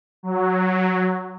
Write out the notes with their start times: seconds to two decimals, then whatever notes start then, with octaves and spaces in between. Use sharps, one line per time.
0.23 F#3